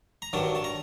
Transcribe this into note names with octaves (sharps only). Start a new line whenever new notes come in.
A#5
G2 D#3 F#3 A5
A5
A#5